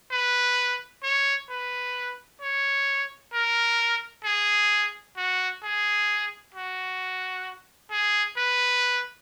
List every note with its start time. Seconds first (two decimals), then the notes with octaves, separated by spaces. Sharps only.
0.12 B4
1.03 C#5
1.50 B4
2.42 C#5
3.34 A#4
4.25 G#4
5.17 F#4
5.63 G#4
6.55 F#4
7.91 G#4
8.37 B4